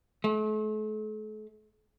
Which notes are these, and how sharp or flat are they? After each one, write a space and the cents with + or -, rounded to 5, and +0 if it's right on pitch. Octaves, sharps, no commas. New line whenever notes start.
A3 -40